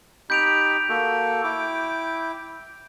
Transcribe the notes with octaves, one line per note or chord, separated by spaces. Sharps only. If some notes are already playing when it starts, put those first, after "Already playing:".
D#4 G4 B5 G6 D7 F7
A#3 F#4 A4
E4 G5 D6